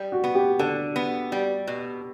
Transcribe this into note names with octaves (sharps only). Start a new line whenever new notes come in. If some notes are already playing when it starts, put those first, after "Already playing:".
Already playing: G3
F#4
B3
G4
D3 A4
B3
G3
B2